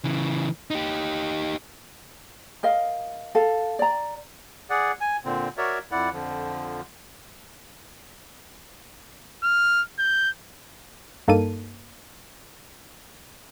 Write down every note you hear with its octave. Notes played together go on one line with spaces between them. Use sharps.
C#3 E3
D#4 G4
A#4 D#5 F5
A4 F5
D5 A#5
G#4 D5 F#5
G#5
A#2 D3 C4
F#4 A#4 C#5 D5 E5
F2 E4 D5 F#5
F2 D3 F3
F6
G6
G2 A#3 D#4 A4 A5 D#7